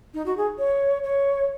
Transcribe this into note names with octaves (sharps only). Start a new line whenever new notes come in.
D#4
F#4
G#4
C#5
C#5